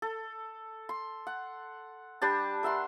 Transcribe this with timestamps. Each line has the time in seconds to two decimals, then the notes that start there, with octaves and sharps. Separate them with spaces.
0.02 A4
0.89 C6
1.27 F#5
2.22 G3 D4 G4 A5
2.63 A#4 E5 F#5 C6